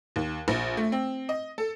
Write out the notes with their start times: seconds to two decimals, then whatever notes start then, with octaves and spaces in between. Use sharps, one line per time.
0.16 D#2
0.48 A#1
0.77 A3
0.92 C4
1.29 D#5
1.58 A4